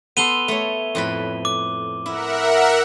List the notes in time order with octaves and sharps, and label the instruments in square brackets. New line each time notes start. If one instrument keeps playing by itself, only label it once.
[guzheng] B3 A4 C6 [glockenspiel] D#7 F7 G7
[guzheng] A3 C#5
F2 A2 B4
[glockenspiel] D6
[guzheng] E4 [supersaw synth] A#4 E5 F#5